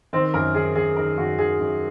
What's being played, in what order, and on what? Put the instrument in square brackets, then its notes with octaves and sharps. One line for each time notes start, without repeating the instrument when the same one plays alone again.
[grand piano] D#3 C4
F#2 A#4
D#3 G#4
F#2 G#4
D#3 A#4
F#2 F#4
D#3 G#4
F#2